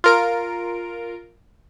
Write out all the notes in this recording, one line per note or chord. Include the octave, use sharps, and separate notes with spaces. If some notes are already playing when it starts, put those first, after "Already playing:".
F4 A#4 D7